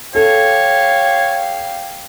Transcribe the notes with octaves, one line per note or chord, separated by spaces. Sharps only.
G4 A4 C#5 F5